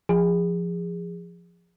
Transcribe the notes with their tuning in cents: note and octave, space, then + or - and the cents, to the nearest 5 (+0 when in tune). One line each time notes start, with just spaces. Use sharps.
F3 +0 G#4 -25